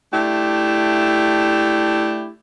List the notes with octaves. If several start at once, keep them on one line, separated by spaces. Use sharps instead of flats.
A3 D4 E4 G4